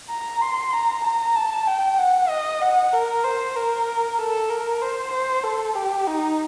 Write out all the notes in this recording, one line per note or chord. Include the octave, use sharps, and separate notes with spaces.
A#5
C6
A#5
A#5
A5
G5
F#5
D#5
F#5
A#4
C5
A#4
A4
A#4
C5
C5
A4
G4
D#4